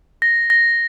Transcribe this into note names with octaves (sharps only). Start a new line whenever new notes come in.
A#6
A#6